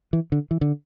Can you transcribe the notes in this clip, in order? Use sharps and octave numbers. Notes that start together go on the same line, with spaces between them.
E3
D3
E3
D3